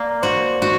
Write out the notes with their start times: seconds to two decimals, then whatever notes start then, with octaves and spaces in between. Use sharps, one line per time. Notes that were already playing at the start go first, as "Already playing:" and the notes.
Already playing: A#3 D5
0.23 F#4 C5
0.62 F#4